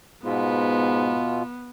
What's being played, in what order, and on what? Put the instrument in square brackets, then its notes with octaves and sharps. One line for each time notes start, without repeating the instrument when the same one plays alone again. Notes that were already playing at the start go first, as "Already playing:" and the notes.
[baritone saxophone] G#2 [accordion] B2 F4 [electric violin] B3